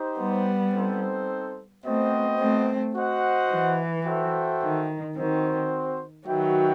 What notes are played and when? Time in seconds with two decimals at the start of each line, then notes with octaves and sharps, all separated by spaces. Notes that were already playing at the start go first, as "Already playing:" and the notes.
Already playing: D#4 G4 C5
0.18 G3 B3
0.73 C4 D#4 A4 C5
1.84 A3 B3 C4 F#4 C5 D#5 G5
2.39 A3 C4
2.95 F#4 C5 D#5 F#5
3.50 E3
4.05 F#4 A4 C5 E5 G5
4.61 D#3
5.16 D#3 C4 F#4 C5
6.26 D#3 F#3 F#4 B4 E5 G5